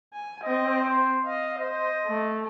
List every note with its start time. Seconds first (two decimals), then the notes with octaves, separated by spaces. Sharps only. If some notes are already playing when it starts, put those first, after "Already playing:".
0.14 G#5
0.44 C4 D#5
0.83 C5
1.26 D#5 F5
1.59 C5 D#5
2.07 A3